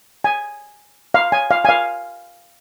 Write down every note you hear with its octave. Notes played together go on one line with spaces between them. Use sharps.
G#5
F5
G#5
F5
G#5
F5